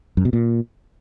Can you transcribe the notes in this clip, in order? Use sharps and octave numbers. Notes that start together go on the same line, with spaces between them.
F#2
B2
A#2